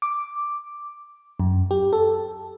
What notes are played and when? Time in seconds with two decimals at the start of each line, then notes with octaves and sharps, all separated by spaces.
0.02 D6
1.40 F#2
1.71 G4
1.93 A4